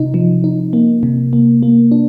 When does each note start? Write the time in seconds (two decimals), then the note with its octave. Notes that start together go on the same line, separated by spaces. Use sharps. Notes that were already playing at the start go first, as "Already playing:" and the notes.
Already playing: C3 D#4
0.14 F3
0.44 D#4
0.73 A#3
1.03 C3
1.33 A#3
1.63 A#3
1.92 D4